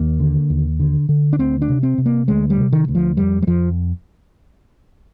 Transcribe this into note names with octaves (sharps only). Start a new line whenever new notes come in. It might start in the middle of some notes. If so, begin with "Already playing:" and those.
Already playing: D#2 A#3
D3
D#2
D3
D3
D4
D2 C4
D4
C3
C4
C3
A#3
D2 G#3
G3
C3
D#3
D2
F3
F2 G3
G3
F2 F3